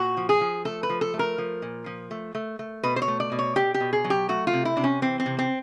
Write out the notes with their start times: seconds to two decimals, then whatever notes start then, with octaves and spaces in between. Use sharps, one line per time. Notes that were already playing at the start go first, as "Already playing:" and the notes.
Already playing: A#2 F#4
0.17 F3
0.29 G#4
0.41 F3
0.65 A3 A4
0.83 B4
0.89 F3
1.01 A4
1.14 A3
1.19 A#4
1.38 F3
1.62 A#2
1.86 F3
2.11 A3
2.35 A3
2.59 A3
2.83 B2 B4
2.96 C5
3.02 C#5
3.08 A3
3.20 D5
3.32 B2
3.39 C#5
3.56 B2 G4
3.74 G4
3.80 B2
3.93 G#4
4.04 F#3
4.10 G4
4.29 A3 F#4
4.47 F4
4.53 C3
4.65 E4
4.77 C3 D4
4.84 C#4
5.02 E3 C4
5.20 C4
5.26 C3
5.39 C4